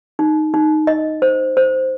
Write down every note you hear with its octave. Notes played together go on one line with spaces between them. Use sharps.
D#4
D#4
D#5
C5
C5